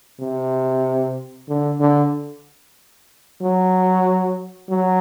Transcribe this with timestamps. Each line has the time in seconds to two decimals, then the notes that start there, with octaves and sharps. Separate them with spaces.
0.20 C3
1.49 D3
1.80 D3
3.42 F#3
4.70 F#3